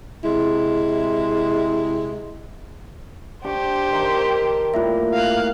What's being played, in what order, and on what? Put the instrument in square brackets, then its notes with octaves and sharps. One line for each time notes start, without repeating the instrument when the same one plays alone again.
[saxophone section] C3 G#3 E4
[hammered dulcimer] D4 C#6 [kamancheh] G4 C5
[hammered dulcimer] D#3 A#5
[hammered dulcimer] A2 G3 A#3 [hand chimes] F4 E5
[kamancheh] F5 F#6